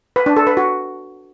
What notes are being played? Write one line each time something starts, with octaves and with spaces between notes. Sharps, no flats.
B4
D4
A4
B4
F#4